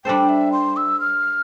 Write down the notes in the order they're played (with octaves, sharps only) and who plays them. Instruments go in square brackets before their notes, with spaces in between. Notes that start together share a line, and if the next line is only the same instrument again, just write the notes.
[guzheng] G3 D4 A4 C5 [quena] G5
[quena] E5
C6
E6
F6